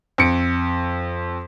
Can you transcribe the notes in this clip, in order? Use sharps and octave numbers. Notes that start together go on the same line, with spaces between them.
F2 C#7 D7